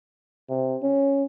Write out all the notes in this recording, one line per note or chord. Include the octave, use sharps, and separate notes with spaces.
C3
C#4